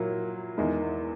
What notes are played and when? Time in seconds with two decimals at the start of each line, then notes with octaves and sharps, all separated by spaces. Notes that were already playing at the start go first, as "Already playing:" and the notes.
Already playing: A#2 F#3 A#3 E4
0.58 E2 D#3 G#3